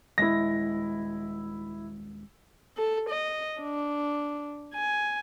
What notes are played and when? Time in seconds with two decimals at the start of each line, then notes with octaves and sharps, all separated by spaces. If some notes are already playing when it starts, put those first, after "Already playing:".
0.18 D#1 G#3 E4 A#6
2.77 A4
3.10 D#5
3.61 D4
4.75 G#5